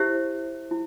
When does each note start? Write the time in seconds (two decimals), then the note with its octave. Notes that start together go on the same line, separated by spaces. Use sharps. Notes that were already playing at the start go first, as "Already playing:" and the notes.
Already playing: E4 G4 C5 E5
0.71 E4